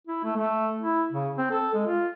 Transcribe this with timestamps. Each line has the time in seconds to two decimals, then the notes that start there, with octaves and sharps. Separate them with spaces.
0.07 E4
0.24 A3
0.37 A3
0.81 E4
1.12 C#3
1.38 C4
1.51 A4
1.74 G#3
1.87 F4